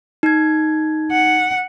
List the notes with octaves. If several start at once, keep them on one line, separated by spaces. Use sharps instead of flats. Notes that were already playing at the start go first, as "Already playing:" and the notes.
D#4 G#6
F#5